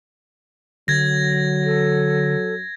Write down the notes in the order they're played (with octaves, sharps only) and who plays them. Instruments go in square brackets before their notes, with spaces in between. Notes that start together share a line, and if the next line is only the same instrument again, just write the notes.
[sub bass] D3 [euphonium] F#3 [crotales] G#6 A#6
[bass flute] A4